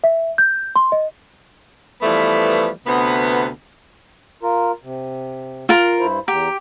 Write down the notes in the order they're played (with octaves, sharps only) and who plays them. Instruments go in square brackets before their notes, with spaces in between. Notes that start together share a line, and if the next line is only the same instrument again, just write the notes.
[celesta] E5
G6
C6
D#5
[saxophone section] E3 F3 G3 A3 B3
D2 C3 B3
[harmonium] F4 A#4
C3
[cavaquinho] F4 A#4
[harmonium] G2 E4 C5
[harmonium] E2 A#5 [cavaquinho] G4